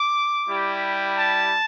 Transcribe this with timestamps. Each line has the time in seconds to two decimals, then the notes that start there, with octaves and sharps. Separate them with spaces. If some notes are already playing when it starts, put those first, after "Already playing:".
Already playing: D6
0.48 G3 E4 G4
1.16 A5